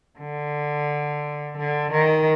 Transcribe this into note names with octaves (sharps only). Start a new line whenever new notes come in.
D3
D3
D#3